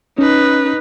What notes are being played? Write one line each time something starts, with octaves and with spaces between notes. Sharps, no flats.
C#4 D#4 B4